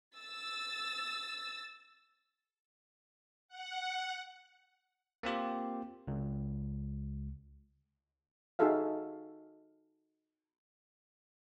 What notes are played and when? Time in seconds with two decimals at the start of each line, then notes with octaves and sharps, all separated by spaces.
0.16 E6 A6
3.48 F#5
5.23 A#3 C4 F4 G4
6.08 C#2
8.59 D#4 F#4 G#4 A4 E5 F5